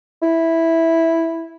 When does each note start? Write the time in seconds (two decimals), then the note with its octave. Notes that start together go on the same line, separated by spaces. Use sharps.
0.23 E4